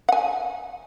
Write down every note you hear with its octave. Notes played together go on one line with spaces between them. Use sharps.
F#5 G#5